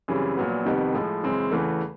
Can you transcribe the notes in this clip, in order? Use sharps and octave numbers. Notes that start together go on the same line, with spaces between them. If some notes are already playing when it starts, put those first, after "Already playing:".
F#2 C#3 E3 G3 C4
A#1 A#2 F#3 B3
F2 C3 D#3 G3 B3
A2 F3 G#3
F#2 C#3 E3 G#3 C4
E2 C#3 E3 A3